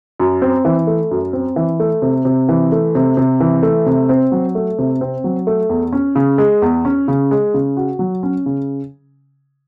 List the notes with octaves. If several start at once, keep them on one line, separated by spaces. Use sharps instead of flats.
F#2
C4
E3
A3
F#2
C4
E3
A3
C3
C3
E3
A3
C3
C3
E3
A3
C3
C4
F#3
A3
C3
C4
F#3
A3
E2
C#4
C#3
G#3
E2
C#4
C#3
G#3
C#3
F#4
F#3
C#4
C#3